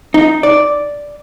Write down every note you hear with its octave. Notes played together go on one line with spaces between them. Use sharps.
D#4
D5